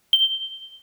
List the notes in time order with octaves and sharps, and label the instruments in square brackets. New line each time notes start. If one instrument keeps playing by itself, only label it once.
[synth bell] G7